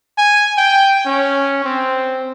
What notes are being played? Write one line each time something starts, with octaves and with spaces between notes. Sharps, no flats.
G#5
G5
C#4
C4